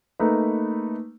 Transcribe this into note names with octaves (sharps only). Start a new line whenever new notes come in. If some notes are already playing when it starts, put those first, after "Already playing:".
A3 A#3 D#4 B4